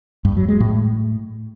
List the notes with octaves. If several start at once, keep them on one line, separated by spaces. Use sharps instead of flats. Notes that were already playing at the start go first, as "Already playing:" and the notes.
G2
F#3
G#3
A2